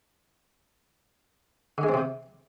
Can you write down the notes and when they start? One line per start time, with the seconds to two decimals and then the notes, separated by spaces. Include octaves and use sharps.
1.78 D3
1.83 G#3
1.89 C4
1.94 C3